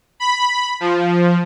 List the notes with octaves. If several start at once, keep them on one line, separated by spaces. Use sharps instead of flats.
B5
F3